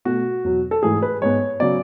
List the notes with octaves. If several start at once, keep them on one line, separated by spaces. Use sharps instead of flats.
B2 A3 F#4
E2 B2 F#3
A4
G#2 E3 A3 G#4
B4
G#2 G#3 B3 C#5
C#3 F#3 B3 D5